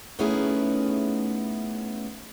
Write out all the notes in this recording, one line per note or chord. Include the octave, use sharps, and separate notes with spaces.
A3 B3 C#4 D#4 E4 G#4